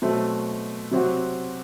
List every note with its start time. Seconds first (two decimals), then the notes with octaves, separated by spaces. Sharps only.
0.02 B2 F#3 A3 C4
0.91 C3 F#3 C4 F#4